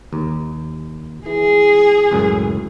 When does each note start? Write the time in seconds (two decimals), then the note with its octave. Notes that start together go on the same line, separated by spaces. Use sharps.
0.13 D#2
1.26 E3 G#4
2.11 C#2 F#2 A2